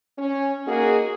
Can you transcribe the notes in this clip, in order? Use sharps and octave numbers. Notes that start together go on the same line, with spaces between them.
C#4
A#3 D#4 F#4 G#4